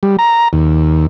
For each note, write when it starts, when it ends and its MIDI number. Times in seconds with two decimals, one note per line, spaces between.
0.03 0.17 55
0.19 0.48 82
0.53 1.06 39